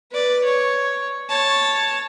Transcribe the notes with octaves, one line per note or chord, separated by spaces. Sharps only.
B4 D5
C#5
C#5 A5